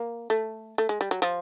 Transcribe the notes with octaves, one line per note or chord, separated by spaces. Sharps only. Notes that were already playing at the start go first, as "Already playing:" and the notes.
Already playing: A#3
A3
A3
G#3
G3
F#3
F3